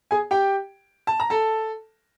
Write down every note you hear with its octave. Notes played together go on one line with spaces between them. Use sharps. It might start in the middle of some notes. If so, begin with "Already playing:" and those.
G#4 G#5
G4 G5
A5
A#5
A4 A5